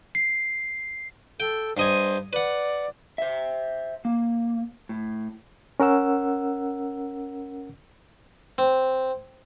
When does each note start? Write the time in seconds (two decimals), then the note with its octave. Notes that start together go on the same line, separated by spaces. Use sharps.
0.15 C7
1.40 A4 G5
1.77 G2 C5 D#5 G#5
2.33 B4 D5 F#5
3.18 C5 E5
4.05 A#3
4.89 A2
5.80 C#4 A#4 F#5 E6
8.58 C4